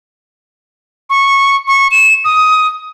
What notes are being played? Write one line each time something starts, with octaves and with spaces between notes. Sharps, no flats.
C#6
C#6
E7
D#6